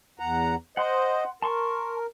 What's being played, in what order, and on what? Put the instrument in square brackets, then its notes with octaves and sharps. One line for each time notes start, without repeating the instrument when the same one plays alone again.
[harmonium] E2 F#5 A#5
[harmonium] C5 D#5 [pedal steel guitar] F#5 C6
[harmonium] A#4 [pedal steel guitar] A5 C6 C#6